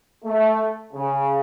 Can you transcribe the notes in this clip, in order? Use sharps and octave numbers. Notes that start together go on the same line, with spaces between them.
A3
C#3